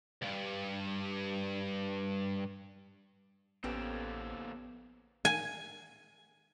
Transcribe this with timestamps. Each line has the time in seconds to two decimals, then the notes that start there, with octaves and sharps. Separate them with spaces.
0.22 C#2 G2
3.64 A1 F2 A#3 B3 C#4 G4 A4 C5
5.25 G#5